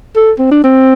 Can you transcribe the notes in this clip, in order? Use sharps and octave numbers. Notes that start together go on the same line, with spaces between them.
A4
C4
D4
C4